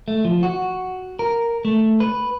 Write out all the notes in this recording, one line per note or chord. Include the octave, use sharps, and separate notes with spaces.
A3
F3
F#4
A#4
A3
B4